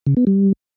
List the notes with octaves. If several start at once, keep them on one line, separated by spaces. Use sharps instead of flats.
C#3
B3
G3